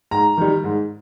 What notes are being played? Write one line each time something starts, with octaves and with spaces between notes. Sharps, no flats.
G#2 A#5
D#3 G3
G#2